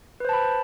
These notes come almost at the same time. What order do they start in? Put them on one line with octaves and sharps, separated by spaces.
B4 C5 A5 B5